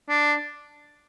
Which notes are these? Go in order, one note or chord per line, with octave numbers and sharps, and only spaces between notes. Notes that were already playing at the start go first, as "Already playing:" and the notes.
D4